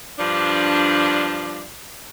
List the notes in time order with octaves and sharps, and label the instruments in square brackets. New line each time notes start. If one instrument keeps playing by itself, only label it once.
[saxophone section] G2 F3 D4